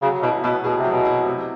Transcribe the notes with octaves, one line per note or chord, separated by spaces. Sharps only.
C#3 F#3
B2 E4
B2 B3
B2 G#4
C3
F#3
B2
E4
C3